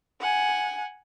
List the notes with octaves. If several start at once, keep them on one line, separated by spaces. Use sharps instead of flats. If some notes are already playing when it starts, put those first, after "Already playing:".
F#5 G#5